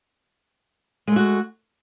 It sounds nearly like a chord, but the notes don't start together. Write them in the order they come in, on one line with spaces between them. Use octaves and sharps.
G#3 A3 F#4